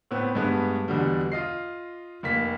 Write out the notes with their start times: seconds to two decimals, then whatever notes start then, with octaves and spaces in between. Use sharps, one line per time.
0.11 A2 B3 C4
0.35 G2 G#3 A3 B3
0.88 E2 B2 D3 G3
1.32 F4 D#5 C7
2.23 F1 A#3 B6